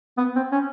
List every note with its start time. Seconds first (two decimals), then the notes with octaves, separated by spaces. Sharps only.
0.18 B3
0.36 C4
0.52 C#4